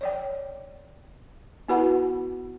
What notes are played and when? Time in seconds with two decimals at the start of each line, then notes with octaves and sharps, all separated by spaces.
0.01 C#5 D5 G5
1.68 B3 E4 F#4 B4 F#5 B5